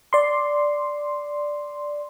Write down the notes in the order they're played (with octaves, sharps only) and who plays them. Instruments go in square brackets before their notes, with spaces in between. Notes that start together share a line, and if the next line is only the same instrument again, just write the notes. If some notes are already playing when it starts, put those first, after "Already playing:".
[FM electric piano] D5 C6